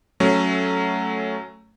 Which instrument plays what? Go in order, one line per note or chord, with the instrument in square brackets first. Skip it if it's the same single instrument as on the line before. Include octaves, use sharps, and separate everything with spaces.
[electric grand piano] F#3 A3 C#4